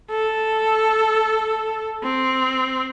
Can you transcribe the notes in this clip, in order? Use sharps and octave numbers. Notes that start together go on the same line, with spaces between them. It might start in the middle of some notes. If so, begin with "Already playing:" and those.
A4
C4